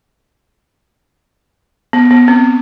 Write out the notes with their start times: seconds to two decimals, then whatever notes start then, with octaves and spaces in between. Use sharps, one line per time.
1.93 B3
2.11 B3
2.28 C4